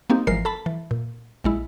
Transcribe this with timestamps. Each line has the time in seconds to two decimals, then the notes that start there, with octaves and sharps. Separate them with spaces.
0.10 A#3 C4 D#4 G4
0.27 G#1 E3 F3 G#3 A#4 C7
0.45 A4 A5 B5
0.66 E3
0.91 A#2
1.44 A#1 G#3 E4